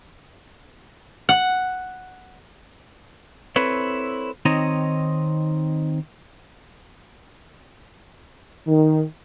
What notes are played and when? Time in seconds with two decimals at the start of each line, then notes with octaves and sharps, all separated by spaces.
1.29 F#5
3.56 C4 E4 A4 B4 C#5
4.45 D#3 C4 D#4 C#5 D#5
8.67 D#3